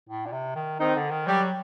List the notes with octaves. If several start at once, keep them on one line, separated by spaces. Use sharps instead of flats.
A2
A#2
C3
D#3
D#3 C4 D#4
D3
D#3
F#3 G3